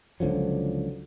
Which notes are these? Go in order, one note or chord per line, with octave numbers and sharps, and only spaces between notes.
C#2 D3 F3 F#3